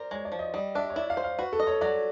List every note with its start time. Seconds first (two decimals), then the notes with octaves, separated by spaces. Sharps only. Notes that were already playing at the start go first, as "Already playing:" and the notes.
Already playing: A#4 C5 D5
0.11 G#3 C#5
0.25 D5
0.32 F3
0.39 D#5
0.54 G3 D#5
0.75 D4 E5
0.90 C#5
0.96 E4 D5
1.10 F5
1.17 C5
1.24 F5
1.39 F#4 B4
1.53 A4
1.60 D#5
1.67 C#5
1.81 F#3 D5